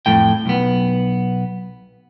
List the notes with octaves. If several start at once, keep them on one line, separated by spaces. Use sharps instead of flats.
F2 A2 G5
B1 B3